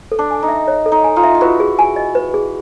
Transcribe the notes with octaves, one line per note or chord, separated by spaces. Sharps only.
A4
D4
G#5
D#4
E5
C#5
A4
D#4
G#5
D#4 F4
E5
F4
E4 F#4 B4
G#4
G#5
D#5
B4
G#4